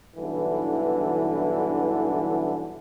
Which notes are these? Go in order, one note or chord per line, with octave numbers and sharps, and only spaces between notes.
B1 G2 D3 E3